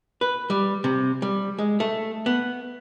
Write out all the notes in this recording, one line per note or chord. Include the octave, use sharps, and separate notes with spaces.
B4
G3
C3
G3
G#3
A3
B3